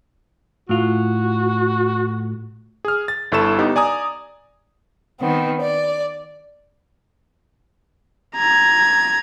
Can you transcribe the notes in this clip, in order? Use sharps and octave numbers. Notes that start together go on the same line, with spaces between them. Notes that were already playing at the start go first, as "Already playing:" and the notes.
A2 F4 F#4
G#4 F6
A6
G1 E4 A4 C#6 A6 E7
B3 D#4 G4
D5 G#5 A#5 D#6
D#3 B3 C4
D5
A#5 G#6